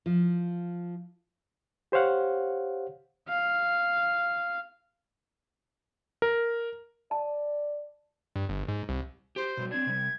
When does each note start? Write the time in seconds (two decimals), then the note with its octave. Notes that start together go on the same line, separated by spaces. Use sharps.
0.06 F3
1.92 G4 C5 C#5 F5 F#5
3.29 F5
6.22 A#4
7.11 D5 A5
8.36 G2
8.49 G1
8.68 G#2
8.89 C2
9.36 G4 C5
9.57 B2 F#3 G3
9.71 C4 D4 G#6
9.86 C3 G3